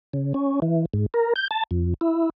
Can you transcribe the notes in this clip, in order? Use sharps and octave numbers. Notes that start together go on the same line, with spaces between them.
C#3
C#4
E3
G#2
A#4
G6
A5
F2
E4